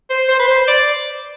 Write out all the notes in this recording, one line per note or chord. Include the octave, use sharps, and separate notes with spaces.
C5
C5
B4
C5
D5